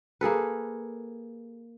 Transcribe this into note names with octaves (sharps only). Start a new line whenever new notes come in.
A#3 G#4 A4 B4